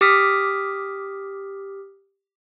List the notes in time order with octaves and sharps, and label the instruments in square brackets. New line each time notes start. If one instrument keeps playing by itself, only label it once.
[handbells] G4 D6 D#6 F6 B6